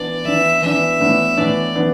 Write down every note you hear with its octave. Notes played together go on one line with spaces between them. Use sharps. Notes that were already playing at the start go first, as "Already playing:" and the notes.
Already playing: E3 B3 D4 D5
E3 B3 D4 E5
E3 B3 D4 E5
A2 E3 B3 D4
A2 E3 B3 D4 D5
E3 B3 D4